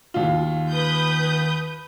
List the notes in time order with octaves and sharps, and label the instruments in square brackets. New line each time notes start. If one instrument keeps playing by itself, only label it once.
[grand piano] D#2 F4
[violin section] B4 D#6 G6